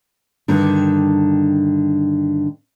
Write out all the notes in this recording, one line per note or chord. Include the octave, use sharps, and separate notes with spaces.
G2 D3 D#3